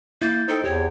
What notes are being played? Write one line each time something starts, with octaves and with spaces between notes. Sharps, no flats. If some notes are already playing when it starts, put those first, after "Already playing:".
A#3 E4 G6 A6
D#4 A4 C5 G5
E2 G4 C#5